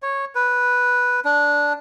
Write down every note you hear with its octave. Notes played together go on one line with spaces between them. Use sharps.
C#5
B4
D4